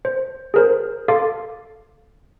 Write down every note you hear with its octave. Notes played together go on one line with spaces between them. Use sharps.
C5
G#4 A#4 C5
A4 F5 C6 D6 A6